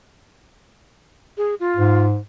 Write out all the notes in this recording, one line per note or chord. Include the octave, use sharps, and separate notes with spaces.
G#4
F4
G#2